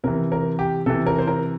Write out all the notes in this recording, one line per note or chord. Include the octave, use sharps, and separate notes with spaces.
C3 E3 A#4
A#4
G4
C3 E3 A4
A#4
C5
A#4